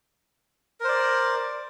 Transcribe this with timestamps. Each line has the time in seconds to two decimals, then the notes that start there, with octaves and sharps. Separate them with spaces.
0.80 A#4
0.84 C5
0.88 D5